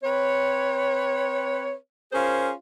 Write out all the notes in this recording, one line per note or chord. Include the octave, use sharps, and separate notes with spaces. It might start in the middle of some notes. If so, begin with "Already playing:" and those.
C4 B4 C#5
C#4 F4 G#4 A#4 C5